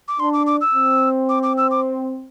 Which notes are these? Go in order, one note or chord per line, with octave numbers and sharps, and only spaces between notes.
D6
D4 C6
D6
D6
E6
C4
D6
D6
E6
D6